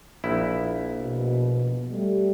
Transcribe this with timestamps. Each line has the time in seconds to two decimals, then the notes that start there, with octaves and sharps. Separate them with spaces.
0.24 A#1 E4
1.00 B2
1.91 G3 A3